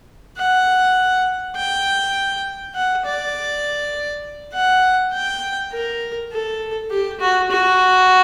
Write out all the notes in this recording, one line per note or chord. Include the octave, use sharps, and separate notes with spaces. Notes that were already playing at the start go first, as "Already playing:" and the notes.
F#5
G5
F#5
D5
F#5
G5
A#4
A4
G4
F#4
F#4